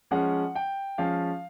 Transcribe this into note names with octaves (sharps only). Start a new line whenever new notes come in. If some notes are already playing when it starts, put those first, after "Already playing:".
F3 G#3 C#4 F#5
G5
F3 G#3 C#4 F5